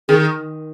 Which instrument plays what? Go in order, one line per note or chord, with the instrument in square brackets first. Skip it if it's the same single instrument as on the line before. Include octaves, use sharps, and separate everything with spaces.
[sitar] D#3 [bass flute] G#4